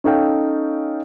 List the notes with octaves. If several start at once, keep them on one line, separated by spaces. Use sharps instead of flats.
C#4 D#4 A4 F5 G5